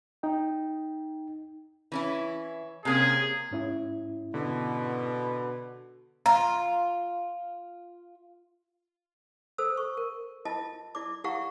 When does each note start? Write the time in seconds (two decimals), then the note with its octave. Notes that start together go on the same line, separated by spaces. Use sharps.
0.23 D#4 G5
1.92 E3 C#4 E4
2.85 C3 A#3 C#4 G#4
3.51 G#2 C#4 E4
4.34 B2 D3
6.26 F4 A#5
9.58 A4 C5 E6
9.77 C#6
9.97 A#4
10.45 E4 F4 D#5 A5
10.95 E4 D5 D6
11.24 E4 G4 F5 F#5 A#5 C#6